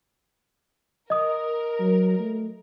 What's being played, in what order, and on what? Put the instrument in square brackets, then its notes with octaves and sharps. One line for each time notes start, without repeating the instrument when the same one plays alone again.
[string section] A#4 [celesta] D#5 D#6
[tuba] F#3
A3